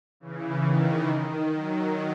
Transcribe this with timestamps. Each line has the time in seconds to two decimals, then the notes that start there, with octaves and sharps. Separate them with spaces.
0.20 C#3 E3
0.64 D#3
1.07 D#3
1.52 D#3 F#3